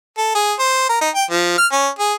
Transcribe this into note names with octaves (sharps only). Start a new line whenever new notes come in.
A4
G#4
C5
A#4
D#4
G5
F3
F6
C#4
G#4